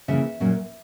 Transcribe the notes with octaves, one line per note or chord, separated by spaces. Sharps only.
C#3 E3 A#3 E4 E5
A#2 F#3 A#3 C#4